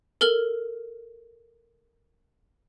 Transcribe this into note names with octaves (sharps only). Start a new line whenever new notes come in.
A4 A#4 F6 F#7